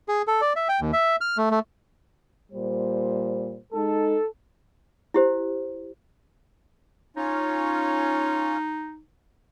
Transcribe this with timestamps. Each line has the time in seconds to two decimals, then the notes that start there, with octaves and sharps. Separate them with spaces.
0.08 G#4
0.27 A4
0.41 D5
0.56 E5
0.69 G5
0.81 D#2
0.93 E5
1.21 F6
1.37 A3
1.51 A3
2.52 A#2 G3 C5
3.73 G#3 D#4 A4
5.14 E4 G4 C5
7.17 C#4 D#4 F4 C#5